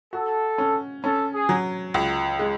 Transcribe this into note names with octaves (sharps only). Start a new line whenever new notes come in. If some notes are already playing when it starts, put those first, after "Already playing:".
F#4 A4
C#4
C#4 A4
G#4
F#3
C#2
G#3